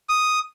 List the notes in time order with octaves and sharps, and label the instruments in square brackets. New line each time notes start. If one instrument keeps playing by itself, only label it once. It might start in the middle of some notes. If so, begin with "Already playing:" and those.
[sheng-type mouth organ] D#6